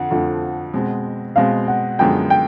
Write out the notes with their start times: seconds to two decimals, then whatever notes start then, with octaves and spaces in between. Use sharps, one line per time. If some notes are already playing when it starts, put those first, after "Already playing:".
Already playing: F2 D3 F#5
0.10 F2 D3 F3 A3
0.74 B2 G#3 C4
1.36 B2 G#3 C4 F5
1.68 F#5
1.99 F#2 D3 F3 G#3 B3 G5
2.30 G5